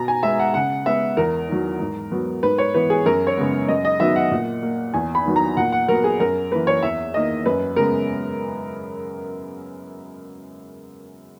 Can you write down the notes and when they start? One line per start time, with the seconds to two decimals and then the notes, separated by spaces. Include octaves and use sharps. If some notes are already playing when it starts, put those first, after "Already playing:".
Already playing: B2 A#5
0.08 G#5
0.23 G#3 B3 E5
0.39 F#5
0.54 C#3 F#5
0.86 G#3 B3 E5
1.17 E2 A#4
1.49 D#3 F#3
1.80 G#2
2.12 F#3 B3
2.43 G#2 B4
2.58 C#5
2.74 E3 B3 B4
2.90 G#4
3.06 F#2 A#4
3.27 C#5
3.37 C#3 G#3 B3
3.68 F#2 D#5
3.85 D#5
4.00 D#3 F#3 B3 E5
4.16 F#5
4.31 A#2
4.63 A#3
4.94 E2 G#5
5.15 B5
5.26 D#3 F#3 B3
5.36 A#5
5.57 A#2 F#5
5.72 F#5
5.88 F#3 B3 A#4
6.04 G#4
6.20 F#2 A#4
6.51 E3 A#3 B4
6.67 C#5
6.83 E2 E5
7.14 D#3 A#3 D#5
7.46 F#2 B4
7.76 C#3 G#3 B3 A#4